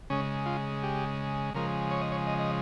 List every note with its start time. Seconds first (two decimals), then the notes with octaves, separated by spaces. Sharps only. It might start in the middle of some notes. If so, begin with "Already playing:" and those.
0.10 C#3 G#3 C#4
0.46 F4
0.83 G4
1.54 C#3 F3 G#3 A#4
1.91 C#5
2.01 D#5
2.12 C#5
2.27 D#5
2.39 D#5